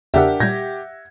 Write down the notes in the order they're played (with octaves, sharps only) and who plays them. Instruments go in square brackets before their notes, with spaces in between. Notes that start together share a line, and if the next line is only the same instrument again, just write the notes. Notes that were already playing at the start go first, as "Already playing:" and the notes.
[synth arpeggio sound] E2 C#3 E6 [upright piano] D4 A#4 [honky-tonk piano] G4 [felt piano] E5 F#5
[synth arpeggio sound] A#2 G3 [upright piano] G6 G#6 A#6